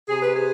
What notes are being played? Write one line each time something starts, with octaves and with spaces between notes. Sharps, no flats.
C3 G#4
B4
G#4